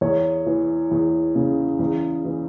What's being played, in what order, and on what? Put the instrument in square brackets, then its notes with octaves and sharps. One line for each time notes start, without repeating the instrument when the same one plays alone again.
[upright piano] E2 C#5
E3
E2
C#3
E2
E3